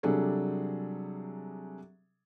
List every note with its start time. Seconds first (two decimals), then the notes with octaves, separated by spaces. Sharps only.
0.03 C3 F#3 G3 D4 G#4 A4